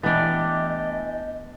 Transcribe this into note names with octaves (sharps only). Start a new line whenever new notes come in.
E3 A3 B3 D4 G4 D#5